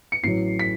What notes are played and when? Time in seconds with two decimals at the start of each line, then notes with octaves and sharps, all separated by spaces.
0.12 C#7
0.23 A1 A2 F#3 C7
0.59 B6